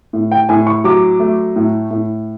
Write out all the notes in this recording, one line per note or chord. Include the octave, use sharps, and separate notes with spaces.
A2
G5
A2 G#5
C#6
F#3 D6
A3
A2
A2